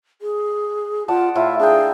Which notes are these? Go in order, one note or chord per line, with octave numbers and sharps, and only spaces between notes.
G#4
F4 D5 F#5 A5
A2 E4 F4 E5
D4 G#4 A#4 G5